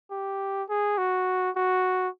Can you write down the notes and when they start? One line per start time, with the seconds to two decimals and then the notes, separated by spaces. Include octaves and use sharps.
0.11 G4
0.69 G#4
0.98 F#4
1.56 F#4